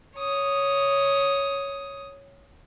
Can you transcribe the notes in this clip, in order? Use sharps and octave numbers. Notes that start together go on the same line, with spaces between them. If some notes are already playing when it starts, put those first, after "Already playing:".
C#5 D#6